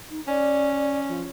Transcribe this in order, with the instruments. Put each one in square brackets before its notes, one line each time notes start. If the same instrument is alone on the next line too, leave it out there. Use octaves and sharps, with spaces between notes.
[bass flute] D#4
[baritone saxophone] C#4 [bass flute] D5
[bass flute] F3